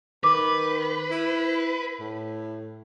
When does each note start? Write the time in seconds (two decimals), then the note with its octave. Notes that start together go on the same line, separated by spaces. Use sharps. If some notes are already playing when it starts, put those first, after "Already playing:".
0.24 D#3 B4 D6
1.11 E4
2.00 A2